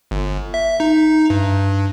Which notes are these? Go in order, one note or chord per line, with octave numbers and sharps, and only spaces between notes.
G1
E5
D#4
G2